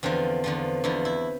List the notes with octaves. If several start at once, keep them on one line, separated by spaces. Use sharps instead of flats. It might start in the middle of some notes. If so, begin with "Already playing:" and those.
E2 D3 F3 C4
E2 D3 F3
E2 D3 F3 E4
E4